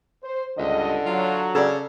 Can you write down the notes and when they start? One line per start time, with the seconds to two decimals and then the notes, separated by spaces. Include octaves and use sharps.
0.24 C5
0.58 C#2 G2 D3 D#5
1.06 F#3 F4
1.55 C#3 A4 D5